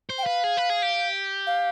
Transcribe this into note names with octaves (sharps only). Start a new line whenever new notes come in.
C5
G5
B4 F5
G#4
B4
G#4
G4
F5